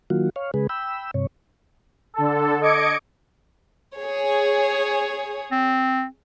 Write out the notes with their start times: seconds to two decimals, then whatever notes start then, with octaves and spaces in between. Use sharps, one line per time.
0.10 D#3 F#3 A#3 F4 F#4
0.36 C#5 F5
0.54 C#3 G#3 G#4 B4
0.69 G5 B5 E6
1.14 G2 C3 C#5
2.14 D3 A4
2.61 D#5 D6 G#6 C#7 D7
3.98 G#4 C#5
5.52 C4